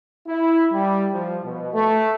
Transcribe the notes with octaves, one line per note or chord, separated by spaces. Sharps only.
E4
G3
F3
B2
A3